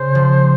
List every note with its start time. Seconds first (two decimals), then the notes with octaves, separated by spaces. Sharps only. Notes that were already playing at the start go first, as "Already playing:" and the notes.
Already playing: C#3 C5
0.15 F3